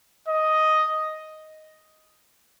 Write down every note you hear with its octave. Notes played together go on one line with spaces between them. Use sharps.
D#5